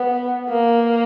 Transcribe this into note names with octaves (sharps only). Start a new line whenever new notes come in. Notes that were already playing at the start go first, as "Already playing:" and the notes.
Already playing: B3
A#3